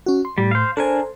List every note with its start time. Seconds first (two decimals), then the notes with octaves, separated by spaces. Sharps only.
0.06 C#4 F#4
0.25 C6
0.38 A2 G3
0.51 C5 F5
0.77 D4 A4 A#4 C5 G#5